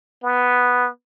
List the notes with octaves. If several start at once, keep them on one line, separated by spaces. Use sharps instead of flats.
B3